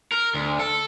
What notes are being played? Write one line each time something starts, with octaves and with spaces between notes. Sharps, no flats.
A#4
D2
A4